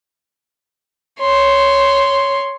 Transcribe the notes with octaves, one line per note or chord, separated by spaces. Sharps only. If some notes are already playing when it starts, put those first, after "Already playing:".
C#5 C6